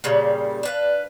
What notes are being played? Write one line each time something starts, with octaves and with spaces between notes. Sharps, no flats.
A#2 C#3 G3
D4 B4 F5